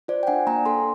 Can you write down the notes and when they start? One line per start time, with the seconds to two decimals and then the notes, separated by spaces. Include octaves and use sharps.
0.08 F4 C5 D5
0.23 G5
0.27 D4 F#5 G#5
0.47 A#3 G#5 A#5
0.65 A4 A#5 C6